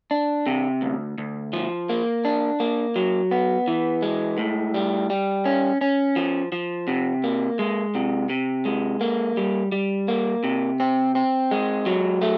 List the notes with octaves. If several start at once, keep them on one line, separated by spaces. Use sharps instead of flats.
D4
C3
D2
D2
F3
A#3
D4
A#3
F#3
B3
E3
G#3
A2
G3
G3
C#4
C#4
F3
F3
C3
A#3
G#3
C3
C3
G#3
A#3
G3
G3
A#3
C3
C4
C4
G#3
F#3
A3